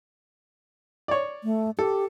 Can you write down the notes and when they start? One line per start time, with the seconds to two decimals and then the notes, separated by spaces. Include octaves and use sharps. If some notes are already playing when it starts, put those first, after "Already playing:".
1.08 C#5 D5
1.44 A3
1.79 G4 A4